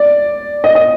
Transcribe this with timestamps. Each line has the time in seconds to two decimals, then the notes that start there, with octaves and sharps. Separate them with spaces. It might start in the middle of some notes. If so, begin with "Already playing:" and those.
Already playing: D5
0.64 D#5
0.75 D#5